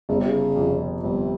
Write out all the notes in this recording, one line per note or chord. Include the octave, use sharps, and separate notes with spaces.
G1 C#3
C3
C#3
F2 C3 F3
G1 C3